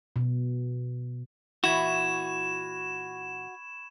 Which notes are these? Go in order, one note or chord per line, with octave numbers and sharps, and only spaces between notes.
B2
A#2 E3 E4 F#4 B5 C#6 G#6 E7